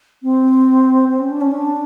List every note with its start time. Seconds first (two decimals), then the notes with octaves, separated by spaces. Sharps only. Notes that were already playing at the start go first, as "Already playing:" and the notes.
0.23 C4
1.09 C4
1.20 C#4
1.30 D4
1.41 C#4
1.52 D4